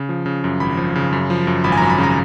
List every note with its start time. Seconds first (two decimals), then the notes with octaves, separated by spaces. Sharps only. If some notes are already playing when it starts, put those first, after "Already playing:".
Already playing: C#3
0.09 F3
0.26 C#3
0.44 F#2
0.60 G#1 B5
0.77 F3
0.95 C#3
1.13 F#2
1.30 F3
1.47 F#2
1.64 G#1 B5
1.72 G#5
1.78 F#2 A#5
1.90 B5
1.98 C#3
2.03 A#5